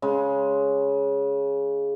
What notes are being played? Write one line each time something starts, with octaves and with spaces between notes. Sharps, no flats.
C#3 G#3